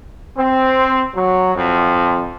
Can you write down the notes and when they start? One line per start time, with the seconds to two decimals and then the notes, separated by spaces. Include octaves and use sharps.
0.36 C4
1.15 F#3
1.55 F2